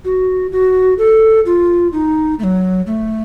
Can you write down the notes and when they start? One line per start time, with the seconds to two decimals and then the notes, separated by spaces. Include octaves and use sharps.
0.05 F#4
0.52 F#4
0.98 A4
1.46 F4
1.93 D#4
2.39 A3
2.44 F#3
2.87 A3